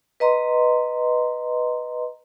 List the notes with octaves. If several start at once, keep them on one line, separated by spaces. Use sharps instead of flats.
B4 D#5 A#5 C6